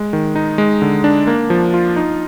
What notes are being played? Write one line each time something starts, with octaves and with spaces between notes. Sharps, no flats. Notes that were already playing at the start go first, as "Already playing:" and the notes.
Already playing: G#3
D#3
D#4
G#3
D3
D4
A#3
F3
F4
D#4